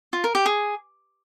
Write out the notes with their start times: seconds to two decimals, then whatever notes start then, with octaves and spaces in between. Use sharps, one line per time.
0.13 F4
0.24 A#4
0.35 G4
0.46 G#4